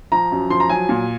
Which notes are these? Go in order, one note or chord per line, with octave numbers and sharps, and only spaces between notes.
F3 A#5
F#2
F3 C6
A#5
F#3 G#5
A#2